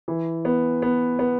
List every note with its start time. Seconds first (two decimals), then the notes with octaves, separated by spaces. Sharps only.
0.08 E3
0.45 B3
0.82 B3
1.19 B3